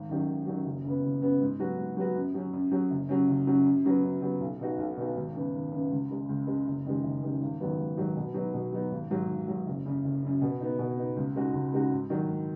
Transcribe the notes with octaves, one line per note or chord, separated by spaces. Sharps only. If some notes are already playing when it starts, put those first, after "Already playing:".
Already playing: G#1
F#2 D#3 F#3
G#1
F#2 D#3 F#3
F#1
F#2 C#3 B3
F#1
F#2 C#3 B3
G#2
F#3 B3 F#4
G#2
F#3 B3 F#4
F#2
F#3 C#4
F#2
F#3 C#4
F#1
F#2 F#3 C#4
F#1
F#2 F#3 C#4
F#2
C#3 F#3 B3
F#2
C#3 F#3 B3
B1
B2 B3 D#4 F#4
B1
B2 B3 D#4 F#4
G#1
F#2 C#3 B3
G#1
F#2 C#3 B3
C#2
C#3 G#3
C#2
C#3 G#3
F#1
F#2 D#3 G#3
F#1
F#2 D#3 G#3
G#1
G#2 D#3 F#3 B3
G#1
G#2 D#3 F#3 B3
B2
F#3 B3 D#4
B2
F#3 B3 D#4
G#1
G#2 F#3
G#1
G#2 F#3
F#1
F#2 C#3
F#1
F#2 C#3
B2
B3 D#4
B2
B3 D#4
C#2
C#3 G#3 D#4 F#4
C#2
C#3 G#3 D#4 F#4
G#2
D#3 F#3
G#2